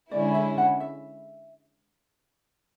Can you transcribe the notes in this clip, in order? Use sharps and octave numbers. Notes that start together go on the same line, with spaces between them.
D3 G#3 C#4 E4 D5
E5
F#5
E5